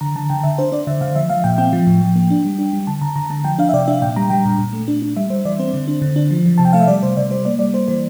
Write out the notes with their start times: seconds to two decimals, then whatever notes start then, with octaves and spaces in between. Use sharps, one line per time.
0.01 D3 A#5
0.16 D3 A5
0.30 D3 G5
0.43 D3 E5
0.58 D4 C5
0.72 D4 D5
0.87 D3 E5
1.01 D3 F5
1.16 F3 E5
1.29 F3 F5
1.44 A#2 G5
1.58 C4 G5
1.73 F3
1.87 A2
2.01 F3
2.16 A#3
2.30 D4
2.45 G3
2.59 D4
2.73 G3
2.87 D3 A5
3.02 D3 A#5
3.16 D3 A#5
3.30 D3 A5
3.44 F3 G5
3.59 D4 F5
3.69 E5
3.73 C3 D5
3.88 D4 E5
4.02 A#2 G5
4.16 G3 A#5
4.30 G3 G5
4.45 A#2
4.58 A#2
4.73 A3
4.88 D4
5.02 D4
5.16 G3 E5
5.30 G3 C5
5.45 E3 D5
5.59 C4 C5
5.74 D3
5.88 D4
6.02 D3
6.16 D4
6.31 F3
6.46 F3
6.58 C3 A5
6.65 G5
6.73 A3 F5
6.80 E5
6.88 G3 D5
7.03 C3 C5
7.17 C3 D5
7.30 G3 C5
7.45 A#3 D5
7.59 G3 D5
7.73 A#3 C5
7.88 E3 C5